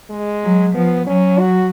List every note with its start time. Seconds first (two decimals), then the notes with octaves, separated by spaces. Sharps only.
0.10 G#3
0.43 F#3
0.74 F3 B3
1.07 F#3 C#4
1.39 F#4